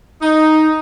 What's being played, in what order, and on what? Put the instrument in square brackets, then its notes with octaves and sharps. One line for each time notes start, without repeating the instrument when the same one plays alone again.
[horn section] D#4